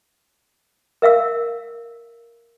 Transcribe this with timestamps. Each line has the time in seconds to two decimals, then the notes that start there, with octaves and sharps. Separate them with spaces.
1.02 A#4 E5 F5 E6